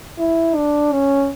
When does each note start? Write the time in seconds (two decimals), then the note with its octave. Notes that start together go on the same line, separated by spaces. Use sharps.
0.19 E4
0.56 D4
0.92 C#4